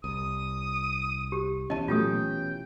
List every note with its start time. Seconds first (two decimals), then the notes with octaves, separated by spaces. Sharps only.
0.04 C2 D#6
1.32 G4
1.70 B2 E3 C#4 D#5 A5
1.88 A#2 F#3 A3 F4 G4 G5 D#6